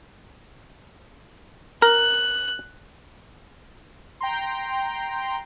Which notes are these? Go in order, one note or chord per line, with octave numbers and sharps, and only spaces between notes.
A#4 F#6
G5 A#5 C6